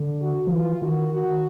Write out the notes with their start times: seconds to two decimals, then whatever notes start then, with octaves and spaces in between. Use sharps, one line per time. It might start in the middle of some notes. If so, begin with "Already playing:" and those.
Already playing: D3
0.21 F#4
0.47 F3
0.52 E3 F4
0.82 D#3 F#4
1.12 F#4